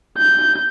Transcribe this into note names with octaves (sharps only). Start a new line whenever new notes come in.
G6